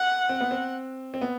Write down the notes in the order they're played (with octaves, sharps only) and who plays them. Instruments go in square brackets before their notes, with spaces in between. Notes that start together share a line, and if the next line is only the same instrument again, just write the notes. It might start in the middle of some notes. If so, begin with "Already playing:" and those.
Already playing: [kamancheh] F#5
[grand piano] C4
B3
C4
C4
B3